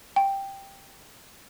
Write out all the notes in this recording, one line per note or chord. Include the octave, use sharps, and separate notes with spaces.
G5